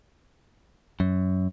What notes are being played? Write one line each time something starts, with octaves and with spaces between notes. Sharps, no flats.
F#2